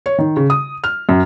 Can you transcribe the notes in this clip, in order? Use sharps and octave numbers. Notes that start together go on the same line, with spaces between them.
C#5
D#3
C#3
D#6
F6
F#2